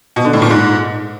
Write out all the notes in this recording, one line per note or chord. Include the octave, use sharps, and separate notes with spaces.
B2
D3
A2
A#2
G#2